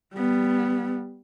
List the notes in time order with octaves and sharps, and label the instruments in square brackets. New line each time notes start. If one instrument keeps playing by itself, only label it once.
[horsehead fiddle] G3 B3